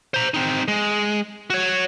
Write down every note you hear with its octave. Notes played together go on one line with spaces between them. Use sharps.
C5 A#5
C4 D#4
G#3
F#4 C#5